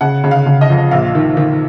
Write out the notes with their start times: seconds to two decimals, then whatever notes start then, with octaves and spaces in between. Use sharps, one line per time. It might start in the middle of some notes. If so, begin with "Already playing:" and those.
0.01 C#3 F#5
0.24 C#3
0.31 F5
0.46 C#3
0.61 D#5
0.70 F2
0.91 A#1 F5
1.15 D#3
1.37 D#3